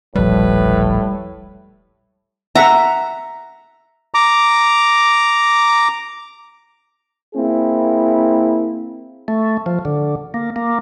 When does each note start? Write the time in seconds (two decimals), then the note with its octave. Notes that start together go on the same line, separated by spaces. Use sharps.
0.15 E1 A#1 A2 F3 G3 B4
2.55 E5 F#5 A#5
4.14 A#5 D6
7.35 A#3 C4 E4 G#4
9.28 A3
9.66 F3
9.85 D3
10.34 A#3
10.56 A#3